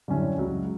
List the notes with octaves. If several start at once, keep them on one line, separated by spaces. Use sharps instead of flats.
F#2 D3 G3 C#4 E4
C#2 C#3 F#3